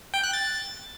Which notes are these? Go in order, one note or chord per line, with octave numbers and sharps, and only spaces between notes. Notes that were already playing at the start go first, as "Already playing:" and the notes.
G5
F#6
A6